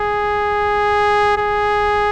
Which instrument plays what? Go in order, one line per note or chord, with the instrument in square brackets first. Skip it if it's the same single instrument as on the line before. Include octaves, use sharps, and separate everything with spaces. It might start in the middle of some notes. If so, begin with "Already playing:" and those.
Already playing: [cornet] G#4
G#4